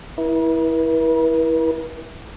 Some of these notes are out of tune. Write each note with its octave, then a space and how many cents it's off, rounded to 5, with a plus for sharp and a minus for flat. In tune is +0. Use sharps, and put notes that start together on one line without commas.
E4 -10 B4 -45